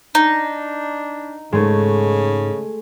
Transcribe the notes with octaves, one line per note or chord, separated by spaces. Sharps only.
D4 D#4
G#2 C#3 G#3 A3